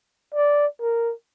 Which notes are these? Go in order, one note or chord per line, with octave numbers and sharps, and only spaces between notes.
D5
A#4